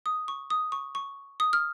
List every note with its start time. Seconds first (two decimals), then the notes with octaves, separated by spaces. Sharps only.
0.06 D#6
0.28 C#6
0.50 D#6
0.72 C#6
0.95 C#6
1.40 D#6
1.53 F6